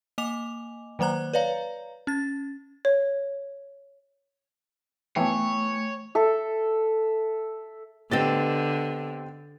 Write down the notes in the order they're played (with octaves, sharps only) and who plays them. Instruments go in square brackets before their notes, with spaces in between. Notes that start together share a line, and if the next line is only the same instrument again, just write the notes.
[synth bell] A#3 D#5 G#5 D6 F7
D#3 F#3 A#3 C5 A#5 F#6
B4 C#5 D5 F5 A#5
C#4 A6
[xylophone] C#5
[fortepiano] E3 B3 [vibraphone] A3 [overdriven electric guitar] C#5 [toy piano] G5 A5
[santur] A4 E5
[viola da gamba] D3 [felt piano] B3 A6 [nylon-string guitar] C4 G4 D#5